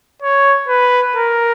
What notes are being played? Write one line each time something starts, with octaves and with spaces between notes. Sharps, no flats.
C#5
B4
A#4